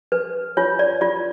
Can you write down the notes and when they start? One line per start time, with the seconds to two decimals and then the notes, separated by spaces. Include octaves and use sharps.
0.12 B4
0.57 F4 C#5
0.79 D5
1.01 F4 D5